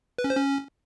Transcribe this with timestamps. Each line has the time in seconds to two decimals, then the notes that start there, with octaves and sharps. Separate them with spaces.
0.18 B4
0.24 C#4
0.30 C5
0.36 C#4